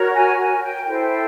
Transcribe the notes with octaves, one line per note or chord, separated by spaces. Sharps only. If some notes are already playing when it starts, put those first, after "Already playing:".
Already playing: F#4 A#4 C#5
G#5
G#5
G5
E4 A4 C5 G5
G5